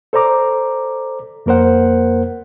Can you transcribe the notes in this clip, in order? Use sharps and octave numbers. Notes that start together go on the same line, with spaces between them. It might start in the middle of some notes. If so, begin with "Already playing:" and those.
A4 C5 D5 A#5 D6
F2 A#3 A#4 C5 F#5